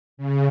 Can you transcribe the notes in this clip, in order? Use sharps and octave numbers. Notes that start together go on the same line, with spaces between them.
C#3